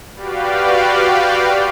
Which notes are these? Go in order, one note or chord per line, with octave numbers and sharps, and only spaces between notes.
F#4 G4 B4 D5 F5 G5